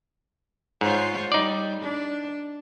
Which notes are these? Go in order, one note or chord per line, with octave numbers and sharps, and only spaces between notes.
G#2 F4 C5 C#5
G3 D#4 D5
D4